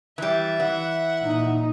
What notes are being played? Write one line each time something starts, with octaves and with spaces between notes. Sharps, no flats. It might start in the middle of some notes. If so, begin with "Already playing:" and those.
E3 G3 E5
E3 F#5
A#2 D#4